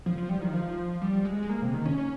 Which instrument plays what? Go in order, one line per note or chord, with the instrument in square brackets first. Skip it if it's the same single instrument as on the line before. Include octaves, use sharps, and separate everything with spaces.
[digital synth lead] F3
F3
G3
F3
D#3
F3
G3
G#3
G#3
A#3
C3
D#3
C#4
C#4